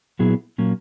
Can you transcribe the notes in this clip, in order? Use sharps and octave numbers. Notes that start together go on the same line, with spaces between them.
A#2 F#3 B3 E4 G#4
A#2 F#3 A#3 C#4